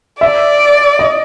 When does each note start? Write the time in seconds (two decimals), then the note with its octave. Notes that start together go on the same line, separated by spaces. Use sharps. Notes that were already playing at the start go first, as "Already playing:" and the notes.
0.21 D5 E5
0.99 D#5